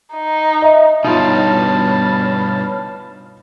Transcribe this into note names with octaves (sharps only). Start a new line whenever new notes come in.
D#4
D#5 E5
G2 B2 D#4 F4 C#5 A5 B5 F6